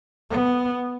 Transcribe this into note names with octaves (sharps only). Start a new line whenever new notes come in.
B3